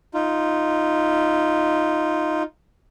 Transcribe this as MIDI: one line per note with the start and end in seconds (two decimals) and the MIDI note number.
0.14 2.43 63
0.14 2.43 65